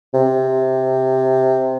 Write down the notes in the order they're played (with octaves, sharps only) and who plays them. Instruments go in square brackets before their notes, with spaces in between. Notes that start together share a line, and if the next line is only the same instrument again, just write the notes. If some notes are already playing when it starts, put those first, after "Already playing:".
[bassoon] C3